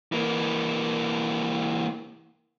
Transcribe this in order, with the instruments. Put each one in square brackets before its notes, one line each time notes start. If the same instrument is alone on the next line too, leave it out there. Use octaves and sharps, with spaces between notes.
[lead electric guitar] E3 A#3